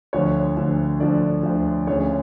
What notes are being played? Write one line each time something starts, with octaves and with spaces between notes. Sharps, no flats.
D2 D3 F3 C#5
D2 D3 F3
D2 D3 F3 D5
D2 D3 F3
D2 C#3 F3 C#5